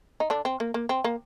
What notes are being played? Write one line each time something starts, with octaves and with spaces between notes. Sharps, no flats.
D#4
D3 D4
C4
A#3
A#3
C4
A#3